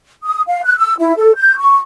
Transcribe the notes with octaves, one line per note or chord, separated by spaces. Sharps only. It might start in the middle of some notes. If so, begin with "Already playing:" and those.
D#6
F5
F#6
E6
E4
A4
G6
C#6